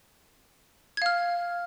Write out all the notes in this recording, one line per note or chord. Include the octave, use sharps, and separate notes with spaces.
F5 F6 G#6